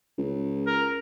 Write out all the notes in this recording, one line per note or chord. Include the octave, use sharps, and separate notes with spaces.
C#2
A#4